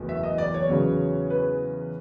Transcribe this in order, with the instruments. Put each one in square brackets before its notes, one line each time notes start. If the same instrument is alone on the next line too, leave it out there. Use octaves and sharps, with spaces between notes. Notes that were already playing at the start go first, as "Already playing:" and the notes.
Already playing: [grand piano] F#1 E2 B2 F#3 A3
E5
D#5
D5
C#5
E2 C#3 F#3 B3
B4